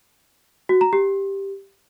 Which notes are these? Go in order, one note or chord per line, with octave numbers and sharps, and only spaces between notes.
F#4
A#5
G4